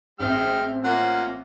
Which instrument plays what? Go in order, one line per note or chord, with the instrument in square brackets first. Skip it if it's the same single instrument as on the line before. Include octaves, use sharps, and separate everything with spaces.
[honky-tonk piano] A1 C4 E5 [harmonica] G#3 G5 F6
[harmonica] A#3 C#4 F4 [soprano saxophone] F#5